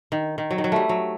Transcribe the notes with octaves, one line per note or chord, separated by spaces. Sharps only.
D#3
D#3
F#3
D#3
F#3
G3 A3
F#3